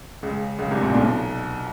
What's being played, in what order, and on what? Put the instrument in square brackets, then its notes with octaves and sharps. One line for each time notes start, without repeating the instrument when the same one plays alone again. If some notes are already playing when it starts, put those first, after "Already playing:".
[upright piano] C#2 C#3
C#2 C#3
C2 C3
A#1 A#2
B1 B2